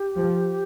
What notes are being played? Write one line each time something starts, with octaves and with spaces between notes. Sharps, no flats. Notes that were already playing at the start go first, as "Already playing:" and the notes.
Already playing: G4
F3